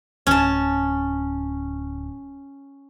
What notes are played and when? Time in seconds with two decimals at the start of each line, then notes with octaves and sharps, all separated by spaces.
0.27 D1 C#4 A5